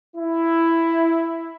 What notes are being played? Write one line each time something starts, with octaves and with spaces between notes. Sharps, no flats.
E4